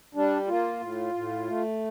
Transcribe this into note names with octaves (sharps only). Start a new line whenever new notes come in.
G3 D4
A#3 F4
A2
A2
A3